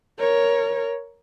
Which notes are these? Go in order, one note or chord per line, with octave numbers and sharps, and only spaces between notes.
A#4 C#5